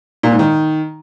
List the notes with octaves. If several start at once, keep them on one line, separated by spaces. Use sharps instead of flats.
A#2
G#2
D#3